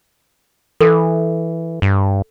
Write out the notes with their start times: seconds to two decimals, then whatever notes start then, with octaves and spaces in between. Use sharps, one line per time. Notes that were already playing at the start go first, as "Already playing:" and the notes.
0.81 E3 A4
1.82 G2